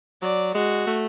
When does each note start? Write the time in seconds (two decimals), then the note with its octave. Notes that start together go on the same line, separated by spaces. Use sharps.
0.22 F#3 D5
0.55 G#3 F#4
0.87 A3